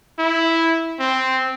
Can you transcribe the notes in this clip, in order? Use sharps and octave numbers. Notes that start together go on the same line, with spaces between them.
E4
C4